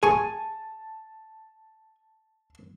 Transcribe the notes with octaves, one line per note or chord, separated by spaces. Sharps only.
G#4 G#5 A5 C#6